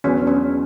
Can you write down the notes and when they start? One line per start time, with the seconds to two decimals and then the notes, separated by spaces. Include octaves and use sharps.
0.04 E2 B2 F#3 B3 C#4 D4
0.27 C#4